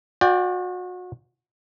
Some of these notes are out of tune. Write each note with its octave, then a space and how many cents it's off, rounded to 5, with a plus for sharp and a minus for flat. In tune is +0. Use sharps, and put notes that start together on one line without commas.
F#4 -35 D5 +5 G5 +10